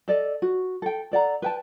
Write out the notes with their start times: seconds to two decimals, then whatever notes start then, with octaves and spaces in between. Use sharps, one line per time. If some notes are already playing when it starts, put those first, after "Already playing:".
0.08 A4 D5 D#5
0.42 F#4
0.82 A4 G5
1.11 A4 D5 F#5 A#5
1.42 B4 G5 A5